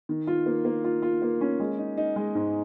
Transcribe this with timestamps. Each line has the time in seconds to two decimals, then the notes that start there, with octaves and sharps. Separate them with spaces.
0.09 D#3
0.27 F4
0.46 A#3
0.65 A#3
0.84 F4
1.02 F4
1.22 A#3
1.41 C#4
1.60 G#3
1.79 D#4
1.97 D#4
2.16 G#3
2.35 G#2